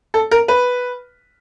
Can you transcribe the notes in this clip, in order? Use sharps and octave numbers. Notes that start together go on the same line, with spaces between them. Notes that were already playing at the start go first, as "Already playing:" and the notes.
A4
A#4
B4